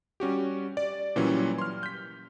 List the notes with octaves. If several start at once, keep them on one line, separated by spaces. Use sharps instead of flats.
G3 C#4 F#4 G4
D5
A#2 E3 F#3 G3 C#4
C6 F6
G6 B6